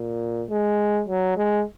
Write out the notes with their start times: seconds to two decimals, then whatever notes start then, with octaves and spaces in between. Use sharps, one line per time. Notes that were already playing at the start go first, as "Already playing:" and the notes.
Already playing: A#2
0.49 G#3
1.08 F#3
1.37 G#3